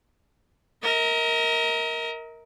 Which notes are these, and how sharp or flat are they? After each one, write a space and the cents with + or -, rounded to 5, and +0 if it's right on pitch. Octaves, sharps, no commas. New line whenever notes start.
A#4 +0 D#5 +45